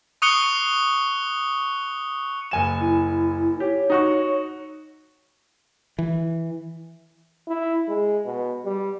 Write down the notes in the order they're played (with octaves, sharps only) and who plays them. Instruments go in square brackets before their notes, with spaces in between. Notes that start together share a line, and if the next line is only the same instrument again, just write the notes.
[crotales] C#6 D#6 F#6 C#7 G7
[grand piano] F#1 G#5 E7
[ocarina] E4
[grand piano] G4 [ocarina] C#5
[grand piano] D#4 F#4 C#6
[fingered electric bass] E3
[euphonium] E4
G#3
B2
G3